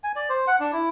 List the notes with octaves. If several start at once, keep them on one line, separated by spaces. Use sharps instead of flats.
G#5
D5
C5
F#5
D4
E4